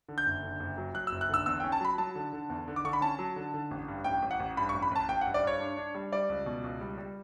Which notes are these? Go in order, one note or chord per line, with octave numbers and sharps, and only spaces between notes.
D3
G6
F#1
D3
F#1
F#3
F#3 F#6
E6
F#1
F#6
D3 E6
E2 E6
C#4 G5
A5
F#3 B5
F#3 A5
D3
D3
E2
D3
D6
D3 C#6
B5
C#4 A5
F#3
D3
D3
A1
G2
A1 G5
A1
F#5
A1
G2 B5
C#6
A1
B5
A1 A5
A1 G5
F#5
G2
D5
G2 C#5
D4
D4
G3
G3 D5
C#2
B2
C#2
G3
G3